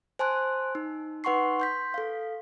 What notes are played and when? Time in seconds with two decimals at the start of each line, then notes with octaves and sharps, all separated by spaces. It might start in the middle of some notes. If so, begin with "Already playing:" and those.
0.19 C5 G#5 A5 C6 F#6
0.75 D#4
1.24 D#4 B4 F#5 C6 C#6 C7
1.60 C6 G6 B6
1.94 A4 F5